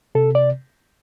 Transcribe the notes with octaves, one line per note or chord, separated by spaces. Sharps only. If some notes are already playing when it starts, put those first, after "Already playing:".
C3 A4
D5